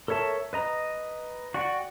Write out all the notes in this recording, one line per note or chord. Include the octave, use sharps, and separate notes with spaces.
A4 A#4 C#5 E5 A5
B4 D#5 A#5
F#4 D5 F#5 G5